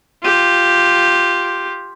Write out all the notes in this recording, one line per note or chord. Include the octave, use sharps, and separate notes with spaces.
F4 G4